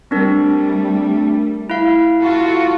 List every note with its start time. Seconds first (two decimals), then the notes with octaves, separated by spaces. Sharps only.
0.11 G3 A3 C4 D4 A#4
1.70 E4 F5
2.21 F4 F#4 A4